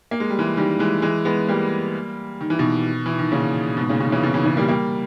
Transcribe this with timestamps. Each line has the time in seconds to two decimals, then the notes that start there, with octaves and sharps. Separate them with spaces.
0.11 A#3
0.20 G#3
0.30 G3
0.39 E3 G#3
0.57 D#3 G3
0.79 E3 G#3
1.02 E3 G#3
1.25 G#3 B3
1.49 G3 A#3
2.41 D#3
2.50 E3
2.59 B2 D#3
3.06 E3
3.19 D#3
3.32 A#2 C#3
3.77 G#2 B2
3.89 A#2 C#3
4.00 B2 D#3
4.12 C#3 E3
4.23 B2 D#3
4.34 C#3 E3
4.45 C#3 E3
4.57 G3 A#3
4.68 G3 A#3